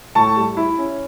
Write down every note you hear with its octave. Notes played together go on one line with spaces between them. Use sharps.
A2 A5 C#6
G3
E4
C#4